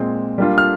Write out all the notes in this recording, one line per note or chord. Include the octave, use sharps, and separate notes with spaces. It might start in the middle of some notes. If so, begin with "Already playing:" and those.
Already playing: A#2 G#3 C4
G3 A#3 D4 F4
F6